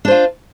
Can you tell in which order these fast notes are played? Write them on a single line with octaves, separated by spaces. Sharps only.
D4 C5 F4